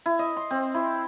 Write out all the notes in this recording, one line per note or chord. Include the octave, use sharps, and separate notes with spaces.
E4
D#5
C6
C4
E4